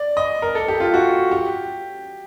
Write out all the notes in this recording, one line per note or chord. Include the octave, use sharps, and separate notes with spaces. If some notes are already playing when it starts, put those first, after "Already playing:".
Already playing: D5
D#5
A#4
A4
G4
F4
F#4
G4